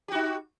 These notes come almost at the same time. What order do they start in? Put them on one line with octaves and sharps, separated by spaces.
G4 F#4 D#4